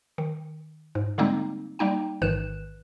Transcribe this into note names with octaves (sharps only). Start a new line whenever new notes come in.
D#3
G#2
D3 G3 G#3 A#3 C4 D#4
G3 A#3 D#4 G5
A1 G#2 D#3 B4 F#6 E7